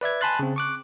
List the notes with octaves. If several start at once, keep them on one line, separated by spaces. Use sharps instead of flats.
B4 D5 E5 G#6
G#5 A5 B5 C6 F#6 A6
C#3 C4
C#6 D6 F#6